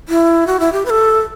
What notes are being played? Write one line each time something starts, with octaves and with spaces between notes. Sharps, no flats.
E4
F#4
E4
G4
B4
A4